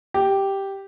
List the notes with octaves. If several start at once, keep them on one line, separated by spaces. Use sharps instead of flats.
G4